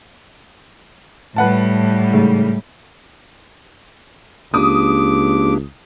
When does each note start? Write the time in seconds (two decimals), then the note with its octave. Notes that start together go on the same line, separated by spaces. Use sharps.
1.36 A2 G3 B4 F#5 A5
2.13 G#2 C#3 A3
4.54 C#2 A#3 D4 G4 D6 D#6